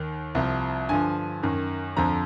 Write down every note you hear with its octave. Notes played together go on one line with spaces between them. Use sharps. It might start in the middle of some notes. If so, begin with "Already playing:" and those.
Already playing: D#2 D#3
C2 C3 F3
G2 D3 F3 G#5
F#2 D#3
F2 D3 F3 A#5